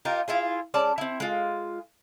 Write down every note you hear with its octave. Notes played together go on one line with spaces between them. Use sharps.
D#4 F4 G4 A#4
E4 F4 G#4
G#3 C#4 D5 A5
C4 E4
G#3 F4